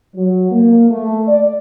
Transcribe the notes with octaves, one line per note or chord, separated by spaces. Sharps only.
F#3
A#3
A3
D5